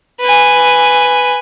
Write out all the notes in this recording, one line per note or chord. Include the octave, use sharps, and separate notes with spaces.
B4 G#5